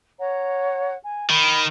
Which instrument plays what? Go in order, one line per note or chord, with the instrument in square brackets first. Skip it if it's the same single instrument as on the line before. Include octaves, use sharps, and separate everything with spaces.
[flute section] C#5 F#5 A#5
G#5
[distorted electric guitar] D#3 [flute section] B5